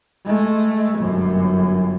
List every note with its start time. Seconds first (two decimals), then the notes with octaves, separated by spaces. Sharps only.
0.25 G#3 A3
0.99 G1 F#2